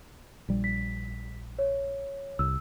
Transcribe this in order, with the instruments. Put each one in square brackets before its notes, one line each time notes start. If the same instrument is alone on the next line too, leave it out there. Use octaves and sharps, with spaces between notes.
[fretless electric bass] A#1 G3
[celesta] B6
C#5
[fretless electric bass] C2 [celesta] E6